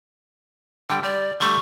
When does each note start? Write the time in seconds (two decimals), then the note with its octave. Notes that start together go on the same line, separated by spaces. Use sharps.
0.90 D3 G3 G5
1.03 G3 D5
1.40 D3 G3 A3 C#6